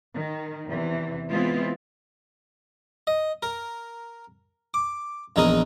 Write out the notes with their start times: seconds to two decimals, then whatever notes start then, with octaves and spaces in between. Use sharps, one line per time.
0.14 D#3
0.66 E2 C3 E3
1.30 E3 G#3 B3 C4 E4 F4
3.07 D#5
3.43 A#4
4.74 D6
5.36 A#1 E2 D#4 G#4 A#4 D#6